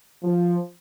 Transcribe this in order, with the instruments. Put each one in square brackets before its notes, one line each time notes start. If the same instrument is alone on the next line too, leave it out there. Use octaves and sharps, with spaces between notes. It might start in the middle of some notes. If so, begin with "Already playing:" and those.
[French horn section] F3